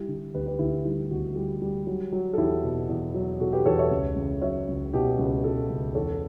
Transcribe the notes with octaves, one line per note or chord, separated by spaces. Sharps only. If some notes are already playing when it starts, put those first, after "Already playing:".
Already playing: G3 E4 G4
D3
D2 G4 B4
G4 B4
D2 E4 G4
G3 E4
D2 F#4
G3
G3
F#3
F#3
A4
E2 E4 G4
B2
E2
F#3
B2 F#4 A4
G4 B4
E2 A4 C#5
C#5 E5
C#2
C#2
F#3 C#5 E5
C#2
B2 E4 G4
C#2
B2 F#4 A4
C#2
E2 A4 C#5